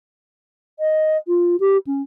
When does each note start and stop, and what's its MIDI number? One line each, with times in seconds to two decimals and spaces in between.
0.79 1.17 75
1.27 1.56 65
1.60 1.77 67
1.86 2.01 61